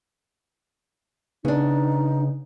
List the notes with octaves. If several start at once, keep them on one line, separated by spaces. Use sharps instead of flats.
C#3 B3 D4 D#4